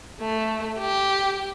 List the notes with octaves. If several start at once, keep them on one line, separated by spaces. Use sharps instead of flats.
A3
G4